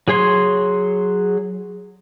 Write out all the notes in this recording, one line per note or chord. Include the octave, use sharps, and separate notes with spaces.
F#3 G#4 C#5 C6